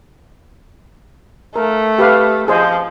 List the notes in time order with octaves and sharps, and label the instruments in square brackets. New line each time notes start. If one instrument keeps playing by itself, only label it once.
[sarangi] A3 [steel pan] A#4
[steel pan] G4 B4 F5
[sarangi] F3 [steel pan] G#4 C5 D#5